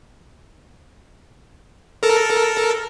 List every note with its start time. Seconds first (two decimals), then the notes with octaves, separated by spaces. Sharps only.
2.03 A4 A#4